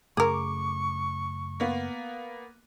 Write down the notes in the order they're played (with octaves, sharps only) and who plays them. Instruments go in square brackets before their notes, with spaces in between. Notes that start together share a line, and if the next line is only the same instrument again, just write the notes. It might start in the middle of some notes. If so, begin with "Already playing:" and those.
[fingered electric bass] F#2 C#3 A3 [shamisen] G#4 A#4 [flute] C#6 [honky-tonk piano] D6
[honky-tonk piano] A#3 B3